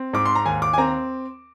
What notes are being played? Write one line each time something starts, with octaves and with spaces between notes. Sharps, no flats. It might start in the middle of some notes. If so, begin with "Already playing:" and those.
Already playing: C4
G#2 D6
C6
A#5
D#2 G#5
D6
G#5
C4 A#5